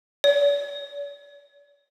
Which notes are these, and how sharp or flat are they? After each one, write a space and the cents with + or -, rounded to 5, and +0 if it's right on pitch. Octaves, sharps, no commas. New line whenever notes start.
D5 -45